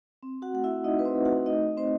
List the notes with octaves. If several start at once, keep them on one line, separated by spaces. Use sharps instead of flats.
C4
F#4 F#5
A3 F#5
E4 E5
A3 D#4 D#5
B4
C4 C5
A3
F#4 F#5
A3 D#4 D#5
C4 D#4 C5